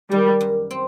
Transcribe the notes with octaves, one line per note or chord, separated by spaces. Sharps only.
D#3 G3
F#2
C4